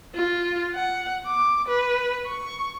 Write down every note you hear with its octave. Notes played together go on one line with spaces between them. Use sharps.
F4
F#5
D6
B4
C#6